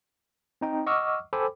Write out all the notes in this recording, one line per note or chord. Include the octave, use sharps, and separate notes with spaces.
C4 D#4 G5
D#5 F#5 C#6 D6 E6 F6
A4 C5 G5 G#5 B5 D6